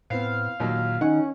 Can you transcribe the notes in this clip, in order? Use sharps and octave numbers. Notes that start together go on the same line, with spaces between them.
A2 B3 C4 F5
D#2 A#2 F#3 A#3
D#3 C#4 D#4 F#5